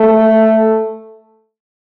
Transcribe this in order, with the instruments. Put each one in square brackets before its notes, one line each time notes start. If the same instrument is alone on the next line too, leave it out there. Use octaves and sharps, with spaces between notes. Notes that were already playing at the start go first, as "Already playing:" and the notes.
Already playing: [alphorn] A3